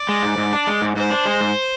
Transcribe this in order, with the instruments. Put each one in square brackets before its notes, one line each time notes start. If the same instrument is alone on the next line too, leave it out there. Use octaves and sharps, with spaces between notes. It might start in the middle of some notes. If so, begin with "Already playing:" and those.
Already playing: [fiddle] D5
[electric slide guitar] G#3
G#2
G#2
D4
G#3
G#2
[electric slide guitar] G#2 [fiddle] C5
[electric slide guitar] D4
G#3
G#2